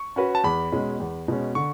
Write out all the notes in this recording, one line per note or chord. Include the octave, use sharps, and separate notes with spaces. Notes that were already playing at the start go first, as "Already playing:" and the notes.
Already playing: C#6
C#4 F#4 B4
A5
E2 B5
B2 G#3 C#4
E2
B2 G#3 C#4
D3 C#6